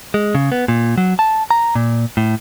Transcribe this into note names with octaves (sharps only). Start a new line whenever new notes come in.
G#3
C#3
B3
A#2
F#3
A5
A#5
A#2
A2